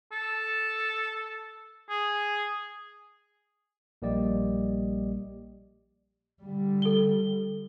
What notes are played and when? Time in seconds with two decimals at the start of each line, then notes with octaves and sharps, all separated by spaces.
0.12 A4
1.90 G#4
4.02 A#1 G3 A#3 G4 D5 D#5
6.43 D3 G3
6.82 A4 G7